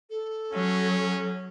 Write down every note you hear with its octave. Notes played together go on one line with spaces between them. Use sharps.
A4
F#3 C#4